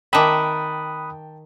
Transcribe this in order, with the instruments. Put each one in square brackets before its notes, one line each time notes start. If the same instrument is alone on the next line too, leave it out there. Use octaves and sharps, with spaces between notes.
[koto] D#3 E5 [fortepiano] G5 A5 D6 [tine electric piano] B5 D#6 F#6